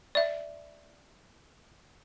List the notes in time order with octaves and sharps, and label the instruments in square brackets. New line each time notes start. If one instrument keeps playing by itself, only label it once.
[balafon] D5 E5